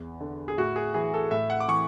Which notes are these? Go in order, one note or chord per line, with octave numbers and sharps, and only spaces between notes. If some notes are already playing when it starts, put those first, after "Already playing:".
Already playing: E2
D3
G#4
A2 F#4
G#4
E3 G#4
A4
A2 E5
F#5
D6
E3 C#6